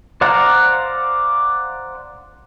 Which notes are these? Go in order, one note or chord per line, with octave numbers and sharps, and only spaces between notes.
C5 D5 F5 F#5 A#5